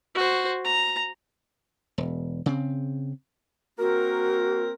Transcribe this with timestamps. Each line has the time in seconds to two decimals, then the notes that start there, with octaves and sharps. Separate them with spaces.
0.15 F#4 C5
0.64 A#5
1.98 E1
2.46 C#3 C4
3.79 A#3 C4 F#4 A#4